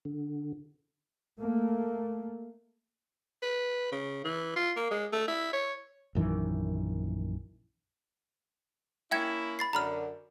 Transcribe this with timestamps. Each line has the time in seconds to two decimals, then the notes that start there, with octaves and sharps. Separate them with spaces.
0.05 D3
1.39 A3 A#3
3.42 B4
3.92 C#3
4.24 E3
4.56 F4
4.76 A#3
4.91 G#3
5.12 A3
5.28 E4
5.53 C#5
6.15 A#1 F#2 D#3 E3
9.11 A#3 C#4 E4 E5 G5 G#6
9.59 B5 A6 C7
9.73 F#2 D3 A#5 B5 F6